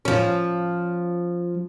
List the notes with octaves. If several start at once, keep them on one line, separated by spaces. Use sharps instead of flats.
F3 C#4